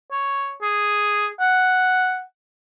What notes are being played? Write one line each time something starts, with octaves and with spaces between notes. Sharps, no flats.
C#5
G#4
F#5